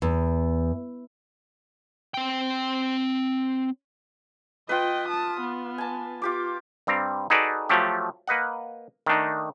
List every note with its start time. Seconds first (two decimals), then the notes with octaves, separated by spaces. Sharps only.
0.02 E2
2.14 C4 G5
4.69 F4 B4 D#5 G5
5.09 A5 D#6
5.41 B3
5.78 G#5 A5
6.22 F4 G4 D6
6.87 G2 G3 C4 A#5
7.30 D#4 F#4 G#4 A4 B4 D5
7.69 F3 F#3 A3 G4
8.27 A#3 B4 D#5 F#5
9.07 D#3 A3 D4 D#4